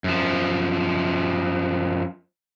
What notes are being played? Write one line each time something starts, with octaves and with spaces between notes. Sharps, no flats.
F#2 F3